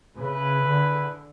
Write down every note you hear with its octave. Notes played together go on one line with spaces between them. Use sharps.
C#3 E4 G#4 B4
D3